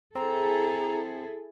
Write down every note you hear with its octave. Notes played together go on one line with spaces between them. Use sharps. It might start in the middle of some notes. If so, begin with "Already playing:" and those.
C4 E4 G#4 A4 A#5